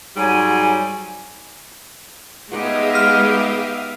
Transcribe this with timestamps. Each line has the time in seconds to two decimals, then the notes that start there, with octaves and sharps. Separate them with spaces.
0.17 G#2 F#3 G3 G#5
2.51 G#3 B3 D#4 G4 E5 F5 D#6
2.95 F6